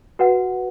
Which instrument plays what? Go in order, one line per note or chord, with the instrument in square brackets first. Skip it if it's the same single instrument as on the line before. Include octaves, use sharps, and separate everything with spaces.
[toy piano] F#4 B4 F#5